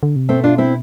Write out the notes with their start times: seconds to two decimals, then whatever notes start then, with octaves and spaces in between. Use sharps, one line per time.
0.03 D3
0.16 C3
0.29 B2 A3 C4
0.44 D4 F4
0.58 C4 E4